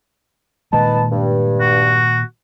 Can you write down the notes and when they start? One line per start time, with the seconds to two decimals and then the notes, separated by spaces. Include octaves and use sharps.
0.73 A#2 D#3 G#3 D#4 B4 A5
1.12 G2
1.61 F#4